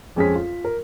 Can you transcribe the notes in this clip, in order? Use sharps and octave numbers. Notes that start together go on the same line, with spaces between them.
F2 G#3 C#4 G#4 B6
F4
A#4